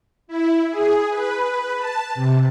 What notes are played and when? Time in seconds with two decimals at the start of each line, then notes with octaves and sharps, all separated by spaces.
0.28 E4
0.70 G#4
1.09 B4
1.78 A5
2.15 C3